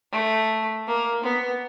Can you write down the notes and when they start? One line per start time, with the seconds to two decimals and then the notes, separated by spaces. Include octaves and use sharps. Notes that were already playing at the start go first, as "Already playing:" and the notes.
0.12 A3
0.87 A#3
1.24 B3